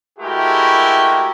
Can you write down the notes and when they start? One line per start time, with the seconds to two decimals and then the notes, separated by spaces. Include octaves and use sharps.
0.19 G#3 A3 E4 F#4 G4 A#4